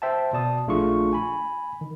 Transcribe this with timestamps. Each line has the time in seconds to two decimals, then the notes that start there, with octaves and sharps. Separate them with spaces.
0.02 C5 E5 G5 A5
0.33 B2 D5 A5 D#6
0.67 A#1 A3 D4 F4 G#4 C#6
1.13 G#5 B5
1.81 D#3